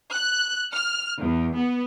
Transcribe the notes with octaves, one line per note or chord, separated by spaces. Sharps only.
F#6
F6
E2
B3